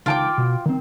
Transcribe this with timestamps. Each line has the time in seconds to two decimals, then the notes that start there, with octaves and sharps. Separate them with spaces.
0.06 C#2 D#3 F4 G5 A5 D6
0.38 B2
0.66 D#3 C4